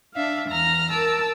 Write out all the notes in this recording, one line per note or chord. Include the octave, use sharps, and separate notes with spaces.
D4 E5 F5
E2 A#5 F6 A#6
A#4 A5 D6 E6